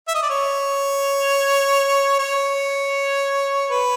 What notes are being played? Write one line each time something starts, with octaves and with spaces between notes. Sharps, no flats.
E5
D#5
D5
C#5
C#5
B4